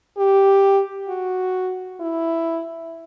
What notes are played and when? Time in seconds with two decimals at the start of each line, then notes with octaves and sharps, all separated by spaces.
0.17 G4
1.09 F#4
2.00 E4